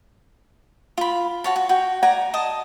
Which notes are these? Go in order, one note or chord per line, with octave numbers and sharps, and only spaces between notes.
F4 B5
F#4 C#5 A5
F#4
F#4 G5
D5 F#5 G#5 A#5
D#5 A5 D#6